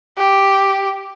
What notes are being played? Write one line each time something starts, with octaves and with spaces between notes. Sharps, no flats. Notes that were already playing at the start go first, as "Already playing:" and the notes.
G4